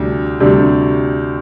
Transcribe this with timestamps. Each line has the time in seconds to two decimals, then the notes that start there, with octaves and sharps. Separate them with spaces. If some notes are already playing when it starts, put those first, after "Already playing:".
Already playing: D2 C3 G3 D4
0.40 D2 C3 G3 D4